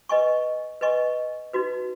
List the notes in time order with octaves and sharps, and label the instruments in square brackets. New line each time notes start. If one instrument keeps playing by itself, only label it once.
[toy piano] B4 D#5 G#5 C#6
B4 D#5 G#5 C#6
D#4 F#4 B4